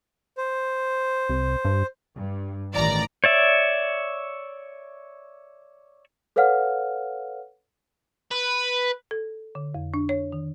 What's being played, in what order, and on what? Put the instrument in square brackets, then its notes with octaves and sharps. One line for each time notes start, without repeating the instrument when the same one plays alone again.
[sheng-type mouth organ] C5
[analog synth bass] C2
G2
[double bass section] G2
[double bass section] A1 D#3 E3 [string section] D5 A#5
[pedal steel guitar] C#5 D5 E5
[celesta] A4 B4 C#5 F5 F#5 F6
[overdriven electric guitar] B4
[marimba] A4
D3
F2
D4
C#5
D#3